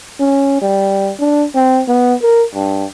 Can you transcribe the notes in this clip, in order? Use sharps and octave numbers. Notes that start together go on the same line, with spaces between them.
C#4
G3
D4
C4
B3
A#4
G2